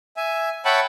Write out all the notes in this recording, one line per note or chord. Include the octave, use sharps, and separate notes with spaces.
E5 G#5
C#5 E5 F#5 G5 A5 B5